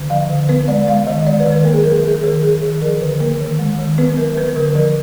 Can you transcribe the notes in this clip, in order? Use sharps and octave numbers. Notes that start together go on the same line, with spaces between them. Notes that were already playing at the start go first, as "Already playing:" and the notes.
Already playing: D3
F3 F5
D3
B3 B4
G#3 D5
G#3 F5
D#3 D#5
G#3 D5
B4
D#3
B4
A#3 A#4
G#4
F#3 A#4
F#3 G#4
D#3 A#4
F#3 G#4
D#3
G#4
F3 A#4
D3 B4
A#3 A#4
D#3
G#3
D#3
B3 B4
F#3 A#4
F#3 B4
D3 A#4
F3 A#4